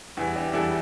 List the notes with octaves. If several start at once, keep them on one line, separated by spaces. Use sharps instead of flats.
E2 E3 G3 E4
D4 G4
E2 E3 G3 E4 A4